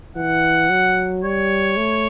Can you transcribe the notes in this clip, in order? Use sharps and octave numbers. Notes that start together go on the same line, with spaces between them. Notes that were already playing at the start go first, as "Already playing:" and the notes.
E3 F#5
F#3
G3 C#5
A3